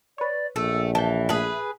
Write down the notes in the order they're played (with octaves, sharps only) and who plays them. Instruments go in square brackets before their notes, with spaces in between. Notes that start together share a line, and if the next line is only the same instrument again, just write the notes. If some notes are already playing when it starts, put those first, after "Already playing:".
[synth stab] B4 C#5 [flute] D5
[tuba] A#1 [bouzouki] A3 [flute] E6
[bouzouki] E3 [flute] E5 [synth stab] A5 G6
[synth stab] A2 A4 F#6 [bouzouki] G#4 B4